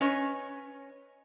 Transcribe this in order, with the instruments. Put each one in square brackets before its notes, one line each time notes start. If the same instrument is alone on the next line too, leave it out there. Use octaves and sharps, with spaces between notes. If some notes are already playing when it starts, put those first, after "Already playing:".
[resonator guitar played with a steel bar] C#4 B4 C#5 D#5